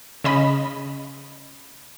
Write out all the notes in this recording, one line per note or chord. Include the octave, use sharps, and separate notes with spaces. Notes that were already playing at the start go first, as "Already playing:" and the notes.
C#3 D#5 B5